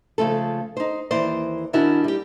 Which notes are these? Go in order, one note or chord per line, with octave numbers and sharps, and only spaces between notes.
C#3 F3 A3 A4
D#4 C5
D#2 E3 C5 D5
D#3 C#4 D4 E4 F#4 A#4
G3 G4